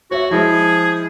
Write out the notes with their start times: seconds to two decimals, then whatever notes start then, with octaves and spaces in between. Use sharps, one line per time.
0.11 F#4 C#5 E5
0.31 F3 G#3 E4 G#4